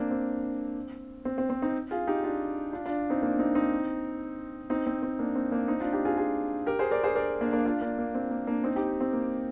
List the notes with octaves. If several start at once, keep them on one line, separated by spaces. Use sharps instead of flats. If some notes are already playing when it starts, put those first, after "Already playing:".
Already playing: A#3 C4 D4
C4
C4
C4
C4
C4 D#4
F4 G#4
D#4 G4
D4 F4
D4 F4
D4 F4
C4 D#4
A#3 D4
C4 D#4
C4 D#4
C4 D#4
C4
C4
A#3 D4
C4
A#3 D4
C4 D#4
D4 F4
D#4 G4
F4 G#4
F4 G#4
G4 A#4
G#4 C5
A#4 D5
G#4 C5
A#4 D5
A#3 D4
A#3 D4
D4 F4
A#3 D4
A#3
C4
A#3
A#3 D4
C4 D#4
D#4 G4
C4
A#3